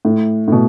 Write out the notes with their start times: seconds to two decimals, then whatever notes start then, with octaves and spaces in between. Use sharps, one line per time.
0.05 A2
0.48 A2
0.52 B2